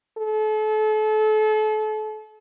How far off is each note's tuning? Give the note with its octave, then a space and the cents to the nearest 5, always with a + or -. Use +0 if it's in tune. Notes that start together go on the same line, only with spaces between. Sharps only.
A4 -35